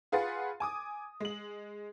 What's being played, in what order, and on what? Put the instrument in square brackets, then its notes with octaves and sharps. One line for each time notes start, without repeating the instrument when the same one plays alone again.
[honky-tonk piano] F4 G#4 B4 F#5 C6 A6
G#5 D6 D#6
G#3 F#7